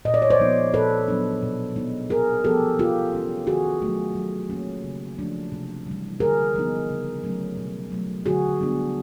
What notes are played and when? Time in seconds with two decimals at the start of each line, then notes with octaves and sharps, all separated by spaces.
0.05 A#2 D#5
0.14 D5
0.22 C#5
0.30 C5 D5
0.40 F3 G#3 B3 D#4
0.74 A#2 A4 B4
1.08 F#3 B3 D4
1.43 B2
1.76 G#3 B3 D#4
2.10 C3 G#4 A#4
2.44 F3 G#3 B3 G4 A4
2.79 C3 F4 G4
3.13 E3 G#3 C#4
3.47 D#3 F#4 G#4
3.82 F#3 A3
4.16 F#3
4.50 A#3 C#4
4.84 C#3
5.19 F3 A3 D4
5.52 C3
5.87 E3 G3
6.20 D3 G#4 A#4
6.55 F3 G#3 B3 D#4
6.90 C#3
7.24 F#3 A3 C#4
7.57 B2
7.92 F#3 A3
8.25 D3 F#4 G#4
8.60 G3 B3 D4